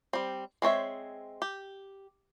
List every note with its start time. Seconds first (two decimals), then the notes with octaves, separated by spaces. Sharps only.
0.13 G3 C4
0.62 G#3 C4 C#5 E5
1.42 G4